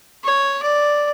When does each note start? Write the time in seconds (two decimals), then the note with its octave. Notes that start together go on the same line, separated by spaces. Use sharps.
0.24 C#5
0.63 D5